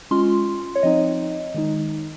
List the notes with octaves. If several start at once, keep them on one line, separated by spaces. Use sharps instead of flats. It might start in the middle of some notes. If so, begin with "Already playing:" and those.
G#3 C#4 F4 C6
C#5
F3 C4 D#4 D#5
D#3 G#3 D#4